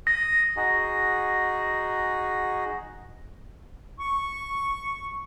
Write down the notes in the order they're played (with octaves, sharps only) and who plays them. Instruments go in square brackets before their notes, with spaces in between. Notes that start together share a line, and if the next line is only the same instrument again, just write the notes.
[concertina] D#6 [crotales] A#6
[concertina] D#4 F#4 G#4
[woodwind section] C#6